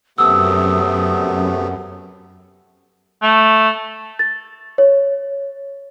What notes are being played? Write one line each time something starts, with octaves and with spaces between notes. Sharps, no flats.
F#2 C3 A3 B3 D#6 E6
A3
A6
C#5